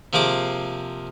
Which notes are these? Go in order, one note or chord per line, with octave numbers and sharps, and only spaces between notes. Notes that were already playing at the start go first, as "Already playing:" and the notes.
C3 F3 A#3 G#4 D6